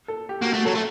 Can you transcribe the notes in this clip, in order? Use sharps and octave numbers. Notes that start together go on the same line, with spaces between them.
A4
G4
A#3 F#4
A3 F#4
F#3 A4
A3